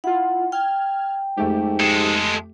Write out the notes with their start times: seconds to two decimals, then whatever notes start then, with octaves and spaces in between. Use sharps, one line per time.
0.04 E4 F4 F#5
0.52 G5 F6 G#6
1.37 F2 G#2 A3 G4
1.80 G#3 A4